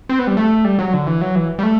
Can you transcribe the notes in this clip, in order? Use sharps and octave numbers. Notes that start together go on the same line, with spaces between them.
C4
B3
G3
A3
G3
F#3
D3
E3
F#3
E3
G3
A3